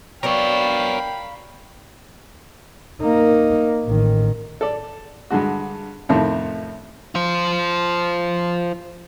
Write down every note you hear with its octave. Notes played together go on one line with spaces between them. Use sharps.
F#3 B3 D4 A#4 C#5 F5 G5 B5
A#3 D#4
A1 D#3
A4 D5
G2 D3 G#3 F#4
F2 A2 C3 D#3 F3
F4 C5